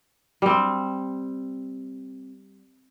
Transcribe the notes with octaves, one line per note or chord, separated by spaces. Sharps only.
G3 C4